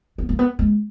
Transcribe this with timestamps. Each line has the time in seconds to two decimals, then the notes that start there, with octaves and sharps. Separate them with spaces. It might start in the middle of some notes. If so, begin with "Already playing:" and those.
0.18 B3
0.29 A#3
0.39 B3
0.59 G#3